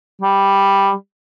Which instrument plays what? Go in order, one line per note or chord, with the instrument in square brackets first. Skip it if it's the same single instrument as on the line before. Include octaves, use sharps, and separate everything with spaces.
[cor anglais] G3